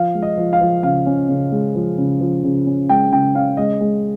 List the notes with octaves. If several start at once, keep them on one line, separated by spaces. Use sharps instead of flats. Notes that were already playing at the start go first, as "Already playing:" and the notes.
Already playing: F3 F5
G#3
D#5
F3
F5
F3
C#3 F5
C#4
C#3
G#3
F3
C#3
F3
C#3
C#4
G#3 G5
C#3 G5
C#4 F5
G#3 D#5
G#3